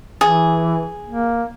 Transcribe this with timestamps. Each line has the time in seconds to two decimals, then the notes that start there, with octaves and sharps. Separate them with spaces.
0.21 E3 G#4
1.06 A#3